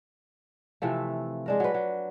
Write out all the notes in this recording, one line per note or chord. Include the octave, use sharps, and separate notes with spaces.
C3 E3 F3 A3
G#3 D4 A#4
F#3 B4
F#3